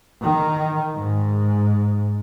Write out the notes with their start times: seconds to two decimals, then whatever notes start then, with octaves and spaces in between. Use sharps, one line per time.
0.23 D#3
0.95 G#2